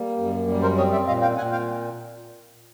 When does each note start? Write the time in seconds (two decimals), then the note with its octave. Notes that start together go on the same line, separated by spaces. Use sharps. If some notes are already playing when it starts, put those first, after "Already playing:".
Already playing: G3 A#3
0.17 F#2
0.47 G3
0.62 A#4 C5
0.77 C4 C#5 D#5
0.92 D5 E5
1.07 A#2 D#5 F5
1.22 F5 G5
1.37 A#2 F#5 G#5
1.52 F5 G5